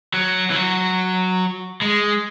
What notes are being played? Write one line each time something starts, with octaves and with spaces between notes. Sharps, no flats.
F#3
E3
F#3
G#3